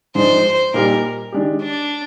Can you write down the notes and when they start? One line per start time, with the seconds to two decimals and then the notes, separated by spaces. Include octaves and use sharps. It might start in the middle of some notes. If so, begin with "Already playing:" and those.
0.15 G#2 F3 G#3 D4 C5
0.74 A#2 G3 A#3 D#4 G4 A#4
1.32 D#3 G#3 D4 G4
1.62 D4